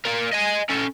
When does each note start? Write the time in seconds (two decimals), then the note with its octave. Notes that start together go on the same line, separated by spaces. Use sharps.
0.05 F4 A#4
0.32 D#5 G#5
0.69 C#4 A4